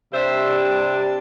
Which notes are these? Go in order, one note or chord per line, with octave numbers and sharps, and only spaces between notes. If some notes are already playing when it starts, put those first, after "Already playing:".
C3 G3 D4 C5 E5